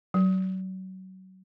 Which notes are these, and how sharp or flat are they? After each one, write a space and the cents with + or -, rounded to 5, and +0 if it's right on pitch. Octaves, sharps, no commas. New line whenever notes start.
F#3 +25